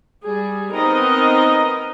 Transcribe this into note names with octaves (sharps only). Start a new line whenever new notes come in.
G3 G#4
B3 C4 D#4 A#4 D#5